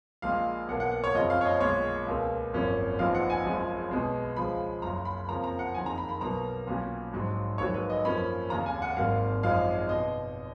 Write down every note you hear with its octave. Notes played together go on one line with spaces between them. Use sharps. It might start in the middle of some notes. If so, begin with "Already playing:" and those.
A#1 A#2 G#3 F5
B1 B2 A#3 F#5
F#5
F#5
C#5
F#1 F2 C#3 F3 D#5
F5
C#5
D#5
B1 A#2 G#3 C#5
C#2 B2 A#3
G#1 F#2 F3 A#3 C#4
A#1 A#2 F3 B3 D#4 F5
F#5
G#5
F#1 F#2 F3 G#3 C#4
B1 B2 G#3
C#2 C#3 F3 G#3 B5
F#1 F#2 C#3 A#5
B5
F2 C#3 F3 A#3 A#5
A#5
F#5
F#1 F2 D#3 G#5
A#5
B5
B5
B1 B2 F#3 A#3 A#5
B1 A#2 F#3 C#4
A#1 G#2 F#3
A#1 G#2 D#3 F#3 C#5
B4
D#5
F#2 F3 A#3 C#4 B5
F1 D#2 C#3 A#5
G#5
F#5
G#1 G#2 F#3 A#3 F5
G#1 F#2 F3 G#3 D#4 F5
B2 D#5